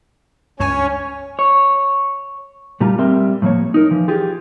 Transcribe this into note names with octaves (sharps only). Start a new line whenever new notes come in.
C#2 G2 C#4 C#5 G#5
C#5
A#2 G3 A3 F4 A#5
G3 C4 A#4 E5 C6
A2 F3 A#3 C#5
D#4 A#4
E3 F3
F4 G4 G#4